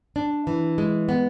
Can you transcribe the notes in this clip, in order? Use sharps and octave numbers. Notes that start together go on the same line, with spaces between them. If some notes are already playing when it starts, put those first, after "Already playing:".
D4
E3
G#3
B3